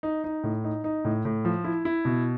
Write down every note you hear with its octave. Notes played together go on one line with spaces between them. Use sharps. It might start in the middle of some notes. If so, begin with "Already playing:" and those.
D#4
D#4
A2
D#4
D#4
A2
A2
F3
E4
E4
B2